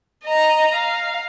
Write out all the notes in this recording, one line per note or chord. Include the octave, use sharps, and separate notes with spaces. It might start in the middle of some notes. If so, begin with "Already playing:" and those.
D#5 A#5
F5